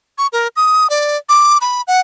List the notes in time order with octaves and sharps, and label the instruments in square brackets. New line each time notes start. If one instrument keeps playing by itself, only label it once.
[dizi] C#6
A#4
D#6
D5
D6
B5
F#5